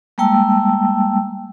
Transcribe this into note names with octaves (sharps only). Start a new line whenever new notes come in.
G3 G#3 A#3 G5 A5 E6